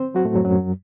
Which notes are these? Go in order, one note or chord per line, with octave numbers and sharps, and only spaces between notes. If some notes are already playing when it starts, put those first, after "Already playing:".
Already playing: C4 C5
F#3 F#4
A2 A3
F#2 F#3
F#2 F#3